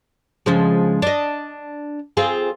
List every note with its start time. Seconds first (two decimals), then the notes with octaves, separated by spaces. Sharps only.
0.46 C#3 F3 G#3
1.02 D4 D#5
2.17 C4 F4 G#4